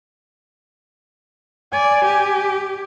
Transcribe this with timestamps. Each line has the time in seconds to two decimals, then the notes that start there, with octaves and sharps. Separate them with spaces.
1.73 D5 G#5
2.05 G4